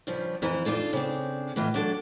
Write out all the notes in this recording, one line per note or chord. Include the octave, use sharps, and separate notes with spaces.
G2 C#3 F3
F2 E3 A#5
D4 D#4 F4 A4
C#3 C4 D4
A2 E3 F4 D#5
F#3 D4 A4